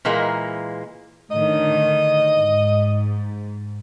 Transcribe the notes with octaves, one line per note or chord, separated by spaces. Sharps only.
A#2 E3 G#3 A#3
A2 D3 D#3 D#5
G#2